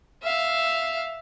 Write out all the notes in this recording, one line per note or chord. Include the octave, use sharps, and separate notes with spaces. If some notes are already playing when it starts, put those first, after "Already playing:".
E5 F5